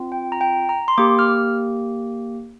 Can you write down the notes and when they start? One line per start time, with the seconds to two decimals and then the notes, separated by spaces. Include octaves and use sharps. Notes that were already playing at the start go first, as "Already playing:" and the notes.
Already playing: C4 F4
0.12 G5
0.32 A#5
0.41 G5
0.69 A#5
0.88 C6
0.98 A#3 G4 D6
1.19 F6